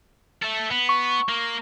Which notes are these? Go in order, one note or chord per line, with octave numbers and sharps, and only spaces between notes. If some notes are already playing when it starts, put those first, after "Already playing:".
A4 E5
B3
C#6
A#3